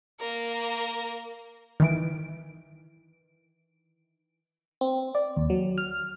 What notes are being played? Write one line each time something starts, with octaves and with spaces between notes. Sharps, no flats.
A#3 A#4
D#3 E3 D7
C4
D5
D#2
F#3
F6